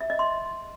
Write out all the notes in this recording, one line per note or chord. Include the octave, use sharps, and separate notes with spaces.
E5
D#5
C6